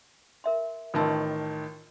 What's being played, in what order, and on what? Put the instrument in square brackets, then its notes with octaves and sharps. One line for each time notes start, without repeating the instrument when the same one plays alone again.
[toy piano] A#4 E5 C6
[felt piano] A1 D#3 A5 [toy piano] F4 E6